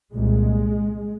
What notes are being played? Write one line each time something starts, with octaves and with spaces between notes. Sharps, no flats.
C2 A#2 G#3